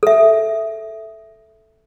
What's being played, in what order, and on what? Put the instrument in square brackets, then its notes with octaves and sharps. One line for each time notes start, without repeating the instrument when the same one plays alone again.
[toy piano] A4 E5